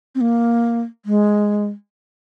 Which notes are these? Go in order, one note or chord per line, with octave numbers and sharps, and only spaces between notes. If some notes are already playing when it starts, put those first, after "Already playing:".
C4
A#3
G#3